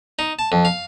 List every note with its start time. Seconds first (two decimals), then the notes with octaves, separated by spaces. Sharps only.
0.19 D#4
0.39 A5
0.52 F2
0.65 F5